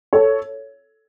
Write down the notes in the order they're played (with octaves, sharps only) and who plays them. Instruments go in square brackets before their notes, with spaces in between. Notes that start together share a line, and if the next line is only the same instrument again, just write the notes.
[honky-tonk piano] A4 C#5